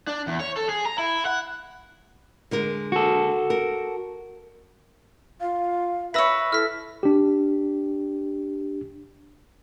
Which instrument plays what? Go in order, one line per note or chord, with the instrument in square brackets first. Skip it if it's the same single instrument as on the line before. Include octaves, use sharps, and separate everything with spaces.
[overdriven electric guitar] D4
E2
C#5
A4
G#4
A#5
E4
F#5
[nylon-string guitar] D3 G#3 A#4
[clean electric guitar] F#4 A4
[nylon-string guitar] A#4
[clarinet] F4 [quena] F5
[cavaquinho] B4 C#5 [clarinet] E5 [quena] B5 [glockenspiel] E6 A#6 B6
[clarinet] E4 [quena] A4 [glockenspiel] F6 B6
[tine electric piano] D4 G4